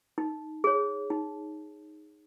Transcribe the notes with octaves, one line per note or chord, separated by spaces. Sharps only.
D#4
G#4 C#5
D#4